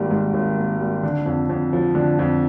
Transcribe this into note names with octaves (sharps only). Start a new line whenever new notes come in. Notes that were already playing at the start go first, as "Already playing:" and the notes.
Already playing: G#1 G#2 G3 A#3
G#2
G#1
A#3
G3
D3
F2
F2
F3
D3
F2